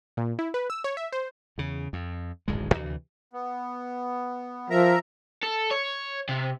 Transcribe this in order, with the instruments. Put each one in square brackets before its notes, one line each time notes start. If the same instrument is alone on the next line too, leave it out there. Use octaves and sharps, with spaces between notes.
[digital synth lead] A#2
E4
B4
E6
C#5
E5
C5
[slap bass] E2 C#3
F2
D1 G#1 F#2 G#3
D2 C3 E3
[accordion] B3
[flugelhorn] F3 [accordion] A#4 E5 A#5
[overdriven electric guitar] A4
C#5
C3